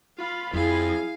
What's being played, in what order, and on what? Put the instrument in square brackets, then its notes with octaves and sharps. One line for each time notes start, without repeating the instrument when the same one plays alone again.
[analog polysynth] F4 B5 [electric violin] F5
[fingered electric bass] F2 [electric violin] E4 G#4 [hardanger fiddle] F5